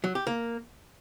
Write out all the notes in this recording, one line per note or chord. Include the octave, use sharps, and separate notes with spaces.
F#3
G4
A#3